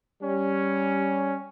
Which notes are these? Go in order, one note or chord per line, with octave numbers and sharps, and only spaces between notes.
G3 C#4